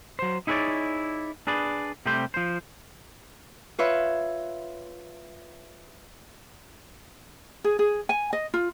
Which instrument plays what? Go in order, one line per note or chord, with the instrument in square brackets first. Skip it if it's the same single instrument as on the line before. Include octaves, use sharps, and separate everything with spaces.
[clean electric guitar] F#3 C5
D#4 E4 G#4 A#4 C#5 D5
D4 G#4 B4 D5
C3 G3 A3 C4 G4 C5
F3 C5
[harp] F4 B4 C#5 E5
[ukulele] G#4
G#4
G#5
D#5
F4